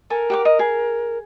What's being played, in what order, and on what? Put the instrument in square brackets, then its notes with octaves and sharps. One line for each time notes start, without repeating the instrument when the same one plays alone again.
[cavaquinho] A4 G#5 [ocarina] A#4
[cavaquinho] G4 F#5 D6
D#5
G#4